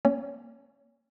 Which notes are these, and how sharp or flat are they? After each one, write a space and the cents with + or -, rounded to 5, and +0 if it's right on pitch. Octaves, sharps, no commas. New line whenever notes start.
A#3 +0 C#4 -15 C#5 +35